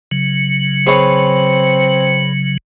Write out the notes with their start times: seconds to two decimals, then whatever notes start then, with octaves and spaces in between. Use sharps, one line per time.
0.11 C#3 F#3
0.86 C4 G#4 B4 C#5